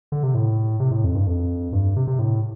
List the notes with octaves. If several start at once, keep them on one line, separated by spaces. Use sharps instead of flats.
D3
C3
A2
C3
A2
F2
G2
F2
G2
C3
C3
A2